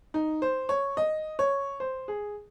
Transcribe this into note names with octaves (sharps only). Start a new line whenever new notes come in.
D#4
C5
C#5
D#5
C#5
C5
G#4